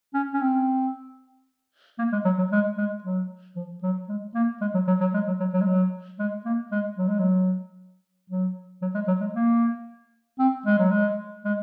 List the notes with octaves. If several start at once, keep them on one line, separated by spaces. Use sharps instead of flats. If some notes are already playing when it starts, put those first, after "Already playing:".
C#4
C#4
C4
A#3
G#3
F#3
F#3
G#3
G#3
F#3
F3
F#3
G#3
A#3
G#3
F#3
F#3
F#3
G#3
F#3
F#3
F#3
G#3
F#3
G#3
A#3
G#3
F#3
G#3
F#3
F#3
F#3
G#3
F#3
G#3
A#3
C4
G#3
F#3
G#3
G#3